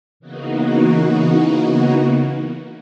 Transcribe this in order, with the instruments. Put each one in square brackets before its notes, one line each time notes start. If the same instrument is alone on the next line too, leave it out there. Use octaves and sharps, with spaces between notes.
[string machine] C#3 E3 A#3 B3 D#4 F#4